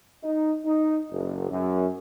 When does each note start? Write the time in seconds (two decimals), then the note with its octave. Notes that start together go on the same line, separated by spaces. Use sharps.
0.22 D#4
0.65 D#4
1.10 F#1
1.49 F#2